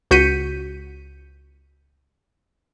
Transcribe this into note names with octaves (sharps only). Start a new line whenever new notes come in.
C#2 F#4 G6 B6 C#7 D#7